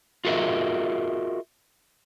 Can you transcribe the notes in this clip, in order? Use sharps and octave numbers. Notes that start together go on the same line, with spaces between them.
F4 F#4 G#4 A#4 D#5 E5